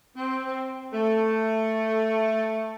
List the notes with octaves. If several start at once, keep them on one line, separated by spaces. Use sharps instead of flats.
C4
A3